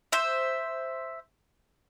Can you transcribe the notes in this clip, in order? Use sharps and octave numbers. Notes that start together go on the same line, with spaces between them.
C5 E5